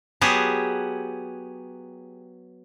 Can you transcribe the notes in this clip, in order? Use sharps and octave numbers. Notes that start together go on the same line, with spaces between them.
F#3 B3 G4 G#4 A5